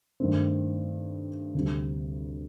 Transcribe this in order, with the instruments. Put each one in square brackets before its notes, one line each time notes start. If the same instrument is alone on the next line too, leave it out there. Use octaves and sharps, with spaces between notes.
[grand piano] G2 D#3 A3 C4
D2 C3 G3 C4